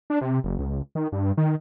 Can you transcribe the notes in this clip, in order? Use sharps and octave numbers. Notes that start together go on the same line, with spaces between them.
D4
C3
F#1
C#2
D#3
G2
D#3